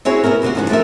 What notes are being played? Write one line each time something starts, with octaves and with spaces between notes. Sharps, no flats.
C4 C#4 E4 F#4 G#4 C#5
B2 B3 E4 A#4
D2 C3 B3 F4 F#4
E2 G#2 F3 C#4 F#5
F3 A3 A#3 A#4 E5